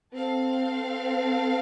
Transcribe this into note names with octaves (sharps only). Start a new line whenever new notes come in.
C4 A4 F5